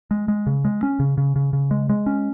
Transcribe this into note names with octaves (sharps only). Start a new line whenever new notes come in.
G#3
G#3
C#3
G#3
C#4
C#3
C#3
C#3
C#3
G#3
G#3
C#4